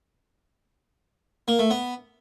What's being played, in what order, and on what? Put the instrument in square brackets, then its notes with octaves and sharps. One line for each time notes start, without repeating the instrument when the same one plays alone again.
[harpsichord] A#3
A3
B3